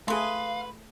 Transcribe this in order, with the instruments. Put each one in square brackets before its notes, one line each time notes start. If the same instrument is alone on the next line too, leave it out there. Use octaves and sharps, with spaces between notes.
[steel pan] A3 G#4 [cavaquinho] B4 C6 [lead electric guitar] F5